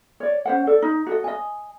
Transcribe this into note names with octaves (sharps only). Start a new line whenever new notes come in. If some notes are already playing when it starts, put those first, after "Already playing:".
C#5 D5
C#4 C5 F#5
A4 D5
D#4
F#4 A4 D#5
D#5 G#5